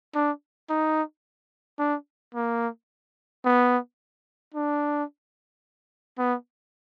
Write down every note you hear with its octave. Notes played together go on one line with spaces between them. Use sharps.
D4
D#4
D4
A#3
B3
D4
B3